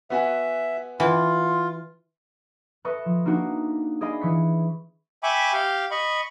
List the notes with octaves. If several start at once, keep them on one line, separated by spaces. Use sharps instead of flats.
B3 F#4 E5 G#5
E3 F4 F#5 C6
A4 B4 D#5 E5 C#6
F3
A#3 D4 D#4 F#4
G#4 D5 D#5 F5 B5
E3 C#6 B6
E5 G5 G#5 B5 C#6 D6
G4 F5 G5
D#5 B5 C#6